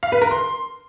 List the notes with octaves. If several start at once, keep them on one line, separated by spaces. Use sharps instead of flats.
F5
B4
A#4
C6